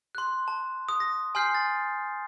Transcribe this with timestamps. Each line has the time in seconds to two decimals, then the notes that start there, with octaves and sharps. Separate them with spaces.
0.15 C6 F#6
0.48 A5
0.89 D#6
1.00 A#6
1.35 G#5 C6 F6 G6 C7
1.55 A6